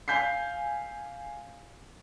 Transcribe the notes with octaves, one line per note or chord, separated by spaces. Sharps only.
F5 G#5 G6 B6 C7